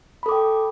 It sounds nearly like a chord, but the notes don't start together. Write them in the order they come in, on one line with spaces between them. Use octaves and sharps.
B5 A4 D6 G5